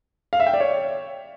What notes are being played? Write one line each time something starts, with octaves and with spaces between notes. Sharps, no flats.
F5
E5
G5
D5
C#5